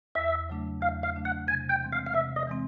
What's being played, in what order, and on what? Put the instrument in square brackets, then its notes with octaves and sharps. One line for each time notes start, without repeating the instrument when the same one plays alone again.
[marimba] E2 [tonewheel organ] E5
[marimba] C#3 F#3 A3 D4
[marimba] E2 [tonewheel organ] F5
[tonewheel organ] F5
[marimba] C#3 F#3 A3 D4
[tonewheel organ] F#5
[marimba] C3 [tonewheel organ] G#5
[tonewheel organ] G5
[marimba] E3 G#3 C4
[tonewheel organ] F5
F5
[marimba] C3 [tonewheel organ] E5
[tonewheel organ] D#5
[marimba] E3 G#3 C4